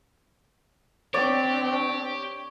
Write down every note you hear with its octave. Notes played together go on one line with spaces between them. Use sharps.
C4 D4 G4 C#5 D5